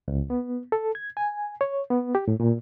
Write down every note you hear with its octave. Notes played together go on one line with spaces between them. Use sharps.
C#2
B3
A4
G#6
G#5
C#5
B3
G4
A2
A#2